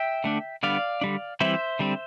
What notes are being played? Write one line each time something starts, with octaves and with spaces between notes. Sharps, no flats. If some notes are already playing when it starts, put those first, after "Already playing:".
Already playing: E5 G5
D3 A3 D4
D3 G3 B3 D4 D5 F5
D3 G3 D4
E3 G3 C4 E4 C5 E5
D3 G3 C4